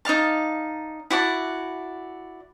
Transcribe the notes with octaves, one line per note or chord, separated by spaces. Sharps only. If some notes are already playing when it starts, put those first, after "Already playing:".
D#4 D5 F5 A5
E4 F#4 D5 A5